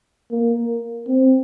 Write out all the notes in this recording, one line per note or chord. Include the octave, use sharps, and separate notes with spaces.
A#3
C4